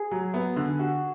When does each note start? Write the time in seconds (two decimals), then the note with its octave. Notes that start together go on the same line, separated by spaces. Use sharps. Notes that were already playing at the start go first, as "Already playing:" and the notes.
Already playing: G#4
0.11 F#3
0.34 B3
0.56 D3
0.79 F#4